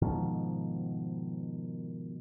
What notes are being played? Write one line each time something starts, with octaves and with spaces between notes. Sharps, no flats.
G#2 B2 D#3 F3